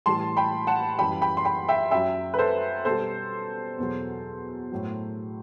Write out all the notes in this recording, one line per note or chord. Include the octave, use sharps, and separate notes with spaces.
A2 E3 G3 A5 C6
G5 B5
F#5 A5
F#2 E3 G3 G5 B5
G5 B5
C6
G5 B5
E5 G5
F#2 F#3 E5 G5
B4
A4 C5
B2 G3 A4 C5
E2 B2 F#3
A2 F#3